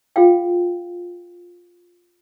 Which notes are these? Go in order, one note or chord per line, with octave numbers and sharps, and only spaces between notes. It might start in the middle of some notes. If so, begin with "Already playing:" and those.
F4 G#4 F5 G5